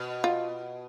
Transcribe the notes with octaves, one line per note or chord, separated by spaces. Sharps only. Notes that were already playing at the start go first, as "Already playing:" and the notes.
Already playing: B2
F4